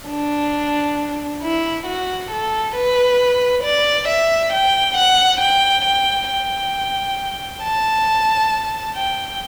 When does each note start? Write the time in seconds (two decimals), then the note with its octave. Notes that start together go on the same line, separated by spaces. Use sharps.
0.09 D4
1.43 E4
1.87 F#4
2.31 A4
2.75 B4
3.63 D5
4.08 E5
4.53 G5
4.97 F#5
5.41 G5
5.85 G5
6.29 G5
7.62 A5
8.95 G5